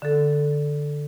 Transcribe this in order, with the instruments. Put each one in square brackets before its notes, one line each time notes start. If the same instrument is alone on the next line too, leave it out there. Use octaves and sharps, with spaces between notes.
[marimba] D3 A4